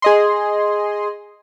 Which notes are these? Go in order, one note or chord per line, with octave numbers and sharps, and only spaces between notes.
G#4 D#5 C6